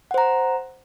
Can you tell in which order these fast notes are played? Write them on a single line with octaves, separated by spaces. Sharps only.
F#5 C5 A#5